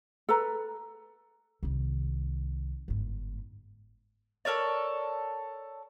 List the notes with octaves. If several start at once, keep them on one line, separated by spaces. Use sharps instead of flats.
A4 B4 A#5
C2 D#3
G1 G#2
A4 A#4 C#5 D5